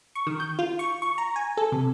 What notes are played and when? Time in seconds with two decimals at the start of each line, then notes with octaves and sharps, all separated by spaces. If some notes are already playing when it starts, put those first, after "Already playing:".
0.15 C#6
0.27 D#3
0.40 G6
0.59 F4
0.79 C#6
1.02 C#6
1.18 A#5
1.36 G#5
1.57 A4
1.72 C3